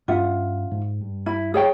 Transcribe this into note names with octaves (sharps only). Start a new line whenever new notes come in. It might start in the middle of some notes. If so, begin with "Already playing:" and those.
G2 C#4 F4 E5 F#5
G#2
G2
E4
G#4 C#5 G5